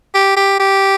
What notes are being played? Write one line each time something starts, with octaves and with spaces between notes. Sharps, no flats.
G4
G4
G4